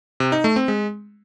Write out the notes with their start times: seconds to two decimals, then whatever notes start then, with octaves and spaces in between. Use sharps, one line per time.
0.20 C3
0.32 D#4
0.44 A3
0.56 C4
0.68 G#3